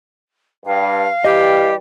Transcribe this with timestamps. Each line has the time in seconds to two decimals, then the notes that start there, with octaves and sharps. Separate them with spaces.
0.65 G2 F5
1.24 E3 G3 G4 D#5